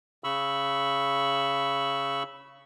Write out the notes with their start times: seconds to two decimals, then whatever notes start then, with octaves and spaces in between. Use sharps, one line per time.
0.24 C#3 B5 C#6 E6